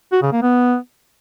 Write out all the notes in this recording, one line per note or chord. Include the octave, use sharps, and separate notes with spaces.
F#4
C#3
A#3
B3